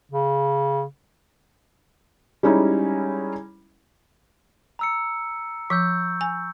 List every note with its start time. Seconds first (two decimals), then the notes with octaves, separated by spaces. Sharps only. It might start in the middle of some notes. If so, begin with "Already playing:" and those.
0.12 C#3
2.43 G3 G#3 C#4 D#4 E4
4.79 A#5 E6 C#7
5.70 F3 C#6 E6 G6
6.21 G#5